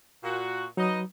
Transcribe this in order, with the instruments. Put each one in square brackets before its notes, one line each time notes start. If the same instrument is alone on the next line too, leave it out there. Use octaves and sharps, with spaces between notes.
[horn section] A#2 F#4
[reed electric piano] F#3 [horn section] D#4 B4 D#5